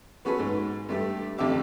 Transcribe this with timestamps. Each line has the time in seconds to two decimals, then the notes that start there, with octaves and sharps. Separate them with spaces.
0.25 B3 C#4 F#4 G#4 A4 B4
0.39 G#2
0.89 G2 A3 G4
1.38 A1 F2 D3 G4 E5 D6